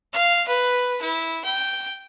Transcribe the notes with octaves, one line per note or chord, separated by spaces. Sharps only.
F5
B4
E4
G5